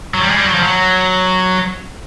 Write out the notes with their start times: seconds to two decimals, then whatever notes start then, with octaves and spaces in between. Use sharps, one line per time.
0.14 F#3
0.21 G3
0.30 G#3
0.37 G3
0.46 F#3
0.54 F3
0.63 F#3